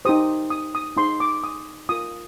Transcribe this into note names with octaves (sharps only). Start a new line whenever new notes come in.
D#4 G4 C5 D#6
D#6
D#6
D#4 G#4 C5 C6
D6
D#6
F4 A#4 D#6